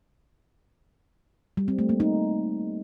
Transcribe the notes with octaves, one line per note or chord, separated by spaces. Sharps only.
G3
C4
A3
A#3
D#4